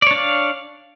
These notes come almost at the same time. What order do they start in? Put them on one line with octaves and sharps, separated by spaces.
D5 C#5 D4 F5